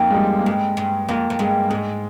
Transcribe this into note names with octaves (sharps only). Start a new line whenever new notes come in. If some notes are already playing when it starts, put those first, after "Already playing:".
Already playing: F2 A#3 D#4
G#3
G3
A#3
G2 G#3
G2
F2 A#3
F2
G2 G#3
G#2 G#3